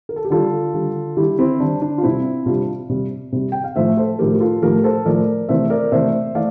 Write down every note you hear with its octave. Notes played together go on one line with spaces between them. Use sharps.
A#4
A4
G4
D3 G3 F4 A4
D3 G3
D3 G3 E4 G4
C4 E4
D3 G3 D4
D4
F4
C3 G3 C4 E4
C3 G3 D4 F4
C3 G3
C3 G3
G5
F5
A2 F3 A3 C5 E5
A4 C5
A2 F3 A3 G4 A#4
G4
F4 A4
A2 F3 A3 G4 A#4
A4 C5
A2 F3 A3 A#4 D5
C3 E3 A3 C5 E5
A#4 D5
C3 E3 A3 C5 E5
E3 A3 D5 F5